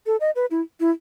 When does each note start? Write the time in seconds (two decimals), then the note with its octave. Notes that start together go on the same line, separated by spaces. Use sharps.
0.06 A4
0.20 D#5
0.36 B4
0.51 E4
0.80 E4